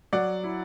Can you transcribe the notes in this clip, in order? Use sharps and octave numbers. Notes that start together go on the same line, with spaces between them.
F#3 D5 F#5
E4